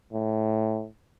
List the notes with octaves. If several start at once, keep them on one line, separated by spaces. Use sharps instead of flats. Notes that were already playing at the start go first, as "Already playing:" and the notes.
A2